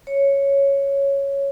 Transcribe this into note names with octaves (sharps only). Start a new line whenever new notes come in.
C#5